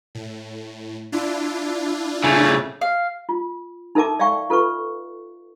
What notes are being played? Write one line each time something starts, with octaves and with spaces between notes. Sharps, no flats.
A2
D4 E4 F4
C#3 A3
F5
F4
D#4 A4 A#4 E5 A5 D6
D5 E5 F5 G5 C#6
F4 A4 B4 C#6